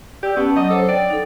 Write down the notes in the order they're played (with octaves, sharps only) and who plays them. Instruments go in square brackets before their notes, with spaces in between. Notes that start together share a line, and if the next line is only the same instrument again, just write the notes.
[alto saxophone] G4 [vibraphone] D5 E6
[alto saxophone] B3 [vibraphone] C#4 A5
[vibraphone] F#3 F#5 D6 [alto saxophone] D#5
[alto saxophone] A4 [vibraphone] C5 C#5
[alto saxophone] D5 [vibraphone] G5
[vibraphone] D#4 A4